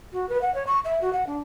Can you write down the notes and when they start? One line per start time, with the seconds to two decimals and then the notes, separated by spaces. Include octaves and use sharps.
0.13 F#4
0.29 B4
0.42 F#5
0.55 C#5
0.67 C#6
0.85 E5
1.01 F#4
1.13 F#5
1.27 D4